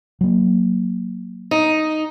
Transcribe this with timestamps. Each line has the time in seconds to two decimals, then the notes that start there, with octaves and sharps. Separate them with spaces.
0.21 F#3 A#3
1.51 D#4